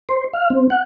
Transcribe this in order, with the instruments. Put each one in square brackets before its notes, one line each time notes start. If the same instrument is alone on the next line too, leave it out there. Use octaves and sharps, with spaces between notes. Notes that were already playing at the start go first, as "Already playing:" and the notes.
[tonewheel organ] C5
F5
C4
F#5